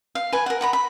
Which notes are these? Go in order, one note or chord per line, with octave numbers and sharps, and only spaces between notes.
F5
B4 G#5
A#4 F#5
F#5 A#5 B5
B5